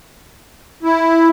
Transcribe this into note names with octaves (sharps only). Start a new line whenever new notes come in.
E4